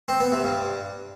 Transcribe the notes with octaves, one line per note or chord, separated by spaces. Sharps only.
C4
B3
C3
G2